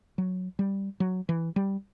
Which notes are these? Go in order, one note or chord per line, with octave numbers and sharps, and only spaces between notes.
F#3
G3
F#3
E3
G3